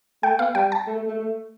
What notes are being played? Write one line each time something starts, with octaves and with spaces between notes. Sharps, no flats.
A3 G5
B3 F5
G3 G5
A5
A3
A3
A3
A3